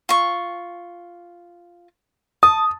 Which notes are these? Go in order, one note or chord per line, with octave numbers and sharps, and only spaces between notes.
F4 C#6
A5 D#6